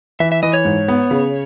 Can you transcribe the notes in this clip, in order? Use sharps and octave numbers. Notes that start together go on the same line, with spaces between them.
E3 E5
E5
E3 D#5
C#5
G#2
B3
C#3